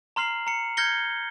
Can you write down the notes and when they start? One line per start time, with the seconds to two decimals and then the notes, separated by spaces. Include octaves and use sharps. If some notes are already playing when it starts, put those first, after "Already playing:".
0.16 A#5 C6 F6 C7 F#7
0.47 A#5 C#7
0.77 F6 G6 G#6 A#6 C#7 G7